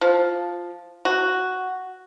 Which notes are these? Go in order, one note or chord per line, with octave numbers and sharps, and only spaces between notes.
F3
F#4